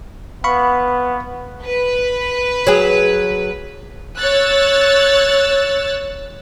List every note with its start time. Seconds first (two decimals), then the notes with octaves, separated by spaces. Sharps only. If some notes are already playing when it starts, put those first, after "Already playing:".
0.44 B3 F5 B5 C#6
1.66 B4
2.67 F#3 G#4
4.17 C#5 E6 F#6 A6